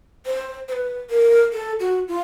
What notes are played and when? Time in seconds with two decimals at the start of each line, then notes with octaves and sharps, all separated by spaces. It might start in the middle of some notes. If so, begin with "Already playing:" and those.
0.26 C5
0.68 C5
0.73 B4
1.10 A#4
1.53 A4
1.80 F#4
2.08 F4